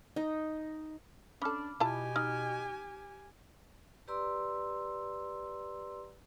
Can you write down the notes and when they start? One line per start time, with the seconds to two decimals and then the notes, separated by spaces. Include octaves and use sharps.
0.16 D#4
1.42 C#4 D4 A4 B5 D6 F6
1.80 B2 E4 F4 G4 G#5 A5
2.16 D#4 F6
4.08 G4 B4 D5 A#5 C6 E6